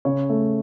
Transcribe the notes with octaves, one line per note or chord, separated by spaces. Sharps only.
C#3 C#5
A3